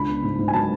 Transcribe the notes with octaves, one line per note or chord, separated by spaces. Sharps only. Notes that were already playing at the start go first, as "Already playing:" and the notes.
Already playing: C#2 D4 B5
B3
G#2
G#2
G#5
F#3 A5